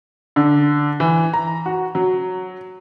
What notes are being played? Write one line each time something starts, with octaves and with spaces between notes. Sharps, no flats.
D3
E3
A#5
F#4
F#3